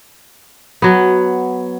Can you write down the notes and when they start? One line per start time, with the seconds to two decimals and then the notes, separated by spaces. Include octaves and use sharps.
0.82 F#3 B3